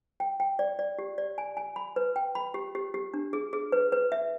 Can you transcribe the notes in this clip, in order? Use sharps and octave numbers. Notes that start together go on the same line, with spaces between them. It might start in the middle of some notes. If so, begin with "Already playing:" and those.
G5
G5
D5
D5
G4
D5
G#5
G#5
B5
B4
G5
B5
G4
G4
G4
D4
G#4
G#4
B4
B4
E5